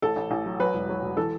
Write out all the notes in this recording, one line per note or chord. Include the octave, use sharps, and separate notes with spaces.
A1 A4
A1
A1
F#3
F#3 B4
E1
F#3
E1
E3 A4